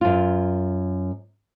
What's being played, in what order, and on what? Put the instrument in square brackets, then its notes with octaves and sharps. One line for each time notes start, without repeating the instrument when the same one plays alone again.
[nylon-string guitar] F#2 F4